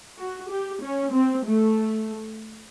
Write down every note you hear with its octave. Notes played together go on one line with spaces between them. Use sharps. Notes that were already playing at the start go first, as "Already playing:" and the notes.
F#4
G4
C#4
C4
A3